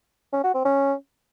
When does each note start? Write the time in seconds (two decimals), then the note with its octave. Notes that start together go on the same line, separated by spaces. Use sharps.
0.33 C#4
0.44 F#4
0.54 C4
0.65 C#4